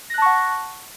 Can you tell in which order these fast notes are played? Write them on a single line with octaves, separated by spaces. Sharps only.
A#6 F#6 A5 C#6 F#5